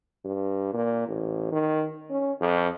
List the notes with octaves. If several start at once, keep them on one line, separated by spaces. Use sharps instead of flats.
G2
A#2
A1
D#3
C#4
F2